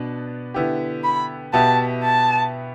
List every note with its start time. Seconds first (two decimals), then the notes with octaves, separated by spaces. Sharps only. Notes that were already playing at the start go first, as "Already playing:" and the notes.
Already playing: B2 B3 D4 B4
0.54 D3 B3 E4 G4
1.04 B5
1.53 B2 B3 G4 E5 A5
2.03 A5